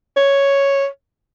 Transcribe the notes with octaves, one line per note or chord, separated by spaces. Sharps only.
C#5